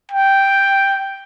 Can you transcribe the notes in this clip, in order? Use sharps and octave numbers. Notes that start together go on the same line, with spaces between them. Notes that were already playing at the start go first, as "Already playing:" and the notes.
G5